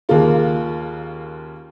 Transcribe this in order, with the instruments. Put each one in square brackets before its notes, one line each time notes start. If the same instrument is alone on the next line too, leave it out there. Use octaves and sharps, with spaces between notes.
[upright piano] D#2 C#3 A#3 F4